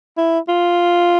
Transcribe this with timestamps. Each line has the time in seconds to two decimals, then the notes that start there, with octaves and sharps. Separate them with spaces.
0.17 E4
0.48 F4